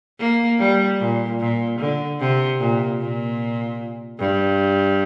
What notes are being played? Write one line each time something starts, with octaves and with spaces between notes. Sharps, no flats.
A#3
G3
A#2
A#2
D3
C3
A#2
A#2
G2